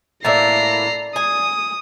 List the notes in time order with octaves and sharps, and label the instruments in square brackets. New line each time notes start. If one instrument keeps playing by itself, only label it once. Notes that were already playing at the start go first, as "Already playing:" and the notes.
[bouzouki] A2 A#3 E4 [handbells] D5 A6 [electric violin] A#5 C7
[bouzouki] G#5 [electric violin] D#6